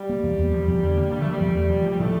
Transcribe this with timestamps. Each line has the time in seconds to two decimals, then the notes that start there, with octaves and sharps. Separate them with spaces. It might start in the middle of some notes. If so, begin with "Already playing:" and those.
Already playing: G3
0.09 A#3
0.23 E2
0.38 E2
0.53 F3
0.68 E2
0.82 D3
0.97 A#3
1.11 D3 G3
1.20 A3
1.26 F3 G3
1.40 E2
1.55 A3
1.70 F3
1.84 F3 G3
1.99 A2 A3